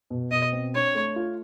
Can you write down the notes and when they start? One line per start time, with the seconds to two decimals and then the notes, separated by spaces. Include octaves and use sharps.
0.10 B2
0.31 B2 D#5
0.52 C4
0.74 D4 C#5
0.95 A3
1.16 F4